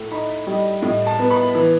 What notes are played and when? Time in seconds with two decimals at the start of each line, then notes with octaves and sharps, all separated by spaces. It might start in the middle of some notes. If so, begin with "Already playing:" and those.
Already playing: A2 A3
0.11 D#4 B5
0.47 G3 D#5
0.82 A2 D#5
1.06 A5
1.19 B3
1.30 B5
1.55 E3